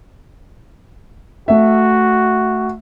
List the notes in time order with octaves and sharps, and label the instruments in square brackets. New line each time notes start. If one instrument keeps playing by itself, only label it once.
[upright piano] A3 E5 [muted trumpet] F#4